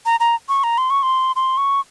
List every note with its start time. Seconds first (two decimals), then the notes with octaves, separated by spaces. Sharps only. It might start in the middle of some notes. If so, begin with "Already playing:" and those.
0.06 A#5
0.20 A#5
0.49 C#6
0.64 A#5
0.78 C6
0.90 C#6
1.03 C6
1.36 C6
1.57 C#6